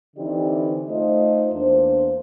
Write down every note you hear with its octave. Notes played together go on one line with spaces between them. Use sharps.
D3 E3 C4 D#4 G4 D5
A3 D#4 F4 C5 D#5
E2 A#3 D4 C5